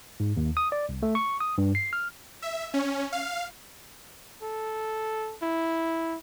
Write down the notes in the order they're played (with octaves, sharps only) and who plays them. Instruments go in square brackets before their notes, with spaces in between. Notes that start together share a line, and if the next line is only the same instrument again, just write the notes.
[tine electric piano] G#2
D#2
D#6
D5
C2
A3
C#6
D#6
G2
C7
F6
[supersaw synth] E5
C#4
F5
[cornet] A4
E4